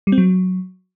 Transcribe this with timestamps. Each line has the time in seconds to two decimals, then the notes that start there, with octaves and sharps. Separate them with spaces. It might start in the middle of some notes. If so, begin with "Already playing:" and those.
0.07 G3
0.12 C4
0.18 F#3